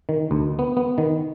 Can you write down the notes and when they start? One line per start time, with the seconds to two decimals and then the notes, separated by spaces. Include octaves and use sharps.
0.09 D#3
0.31 D2
0.59 B3
0.77 B3
0.98 D#3